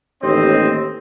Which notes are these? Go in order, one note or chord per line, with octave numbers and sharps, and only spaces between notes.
A1 D#2 C4 C5 D#5